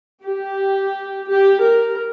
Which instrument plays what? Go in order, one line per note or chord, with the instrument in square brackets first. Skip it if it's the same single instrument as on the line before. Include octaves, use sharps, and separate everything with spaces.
[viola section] G4
G4
A#4